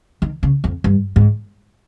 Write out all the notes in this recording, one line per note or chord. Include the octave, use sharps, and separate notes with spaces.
D#3
C#3
F2
G2
G#2